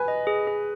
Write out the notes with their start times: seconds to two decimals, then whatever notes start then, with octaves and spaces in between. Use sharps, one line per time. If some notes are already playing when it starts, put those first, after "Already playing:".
Already playing: B4 G#5
0.08 D#5
0.27 G#4
0.47 G#4